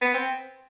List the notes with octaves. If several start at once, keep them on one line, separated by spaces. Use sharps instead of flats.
B3
C4